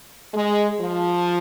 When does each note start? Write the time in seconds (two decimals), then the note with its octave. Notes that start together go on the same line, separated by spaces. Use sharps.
0.34 G#3
0.81 F3